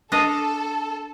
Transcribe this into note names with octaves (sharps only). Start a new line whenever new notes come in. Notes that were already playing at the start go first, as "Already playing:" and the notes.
D4 A4 D#5 F5